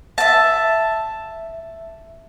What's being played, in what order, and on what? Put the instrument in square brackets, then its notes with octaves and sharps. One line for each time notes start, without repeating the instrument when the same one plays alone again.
[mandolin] E5 A5